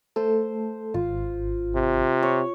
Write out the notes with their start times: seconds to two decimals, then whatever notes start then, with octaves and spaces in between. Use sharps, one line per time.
0.16 A3 A4 C5
0.94 G#1 F4
1.75 C3
2.23 C#5